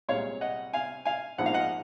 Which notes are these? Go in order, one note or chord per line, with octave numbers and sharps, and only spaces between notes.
C2 A#2 G#3 C#5 F5
D#5 F#5
F5 G#5
F5 G#5
A#1 G#2 F3 A#3 F#5
F5
D#5 F#5